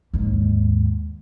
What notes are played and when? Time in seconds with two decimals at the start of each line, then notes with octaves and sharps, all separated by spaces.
0.14 D#2 G#2